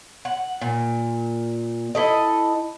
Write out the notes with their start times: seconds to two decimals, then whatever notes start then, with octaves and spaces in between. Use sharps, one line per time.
0.25 F#5
0.61 A#2
1.95 E4 A4 D#5